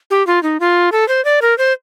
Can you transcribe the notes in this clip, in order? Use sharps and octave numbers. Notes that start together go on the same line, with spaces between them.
G4
F4
D#4
F4
A4
C5
D5
A#4
C5